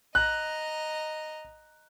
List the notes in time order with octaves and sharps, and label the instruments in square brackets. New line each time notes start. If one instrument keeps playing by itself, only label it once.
[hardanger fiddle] D#5 A#5 [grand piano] F#6